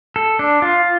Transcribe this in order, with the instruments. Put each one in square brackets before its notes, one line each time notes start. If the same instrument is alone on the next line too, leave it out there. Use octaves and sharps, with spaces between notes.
[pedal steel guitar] A4
D4
F4